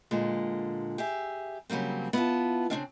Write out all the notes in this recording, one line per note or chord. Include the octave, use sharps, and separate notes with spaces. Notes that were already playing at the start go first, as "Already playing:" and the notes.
A#2 D3 G#3
G4 G#4 E5
C#3 F#3 G3 A#3 C4
B3 E4 F4 A5
C#3 A#3 C4 D4